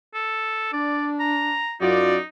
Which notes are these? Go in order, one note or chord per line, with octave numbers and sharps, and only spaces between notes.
A4
D4 D5
A#5
F#2 D#4 F4 F#4 D5